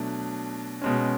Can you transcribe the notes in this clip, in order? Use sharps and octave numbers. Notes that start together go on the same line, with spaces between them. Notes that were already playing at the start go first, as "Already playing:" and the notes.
Already playing: B2 F#3 A3 D4
B2 G#3 C#4